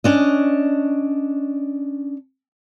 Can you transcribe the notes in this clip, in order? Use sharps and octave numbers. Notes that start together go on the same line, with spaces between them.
C#4 D4 D#5